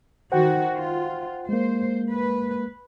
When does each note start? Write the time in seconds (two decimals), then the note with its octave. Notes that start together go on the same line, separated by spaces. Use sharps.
0.32 D#3 F#4 C5 F#5 G5
0.74 F4
1.49 G#3 A#3 C5
2.09 B4